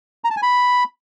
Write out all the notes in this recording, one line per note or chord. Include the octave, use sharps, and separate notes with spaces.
A#5
A5
G#5
B5